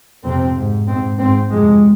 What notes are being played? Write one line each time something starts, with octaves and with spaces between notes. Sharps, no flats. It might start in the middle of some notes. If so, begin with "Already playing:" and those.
F2 C3 C4
G#2
G#2 C4
G#2 C4
F2 C3 G#3